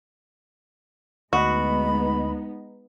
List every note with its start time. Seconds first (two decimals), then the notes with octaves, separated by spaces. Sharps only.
1.33 D2 G#3 B3 D#4 F#4 D#5 B5